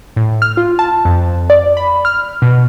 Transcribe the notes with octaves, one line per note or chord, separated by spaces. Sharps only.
A2
F6
F4
A5
F2
D5
B5
F6
B2